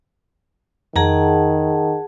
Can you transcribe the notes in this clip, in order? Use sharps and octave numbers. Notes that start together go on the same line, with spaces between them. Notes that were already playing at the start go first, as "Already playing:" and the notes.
F2 D#3 G#4 F#5 A5 A#5